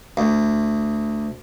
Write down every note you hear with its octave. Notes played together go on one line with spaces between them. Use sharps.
D2